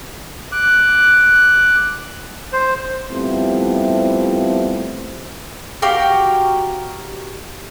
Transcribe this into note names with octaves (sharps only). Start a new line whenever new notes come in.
D6 F#6
C5
F3 G3 A3 B3 C4 E4
F#4 G4 A#4 F5